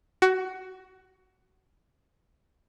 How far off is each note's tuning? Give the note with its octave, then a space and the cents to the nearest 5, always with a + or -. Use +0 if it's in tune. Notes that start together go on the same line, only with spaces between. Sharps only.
F#4 +20